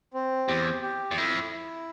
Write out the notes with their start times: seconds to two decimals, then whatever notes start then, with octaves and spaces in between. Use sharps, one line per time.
0.14 C4
0.48 E2 G4
0.82 G4
1.11 E2
1.17 F2 E4
1.52 E4